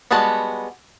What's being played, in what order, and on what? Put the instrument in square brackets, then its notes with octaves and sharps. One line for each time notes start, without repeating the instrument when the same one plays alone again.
[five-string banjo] G3 G#3 B3 F#4 A5